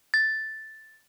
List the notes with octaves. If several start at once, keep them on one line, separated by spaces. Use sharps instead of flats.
A6